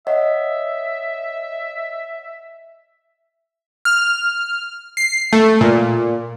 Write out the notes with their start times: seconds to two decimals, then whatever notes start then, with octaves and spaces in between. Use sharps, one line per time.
0.07 C#5 D#5 E5 F#5
3.85 F6
4.97 C7
5.33 A3
5.61 A#2